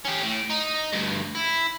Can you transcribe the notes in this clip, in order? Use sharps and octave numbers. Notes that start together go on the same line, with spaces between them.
C#4 G4
A2
D#4
D2 G2
E4